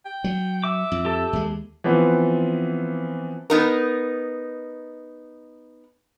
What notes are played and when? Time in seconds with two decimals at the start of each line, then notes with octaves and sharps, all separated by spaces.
0.05 G5
0.24 F#3
0.64 E5 D6
0.92 F2
1.05 G4 A4
1.33 D#2 G#3
1.84 E3 F3 B3 C4
3.50 B3 D#4 A#4